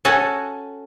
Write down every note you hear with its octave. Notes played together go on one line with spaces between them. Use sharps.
C#4 F#4 A4 G#5 A5